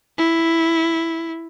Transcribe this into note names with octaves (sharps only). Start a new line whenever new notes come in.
E4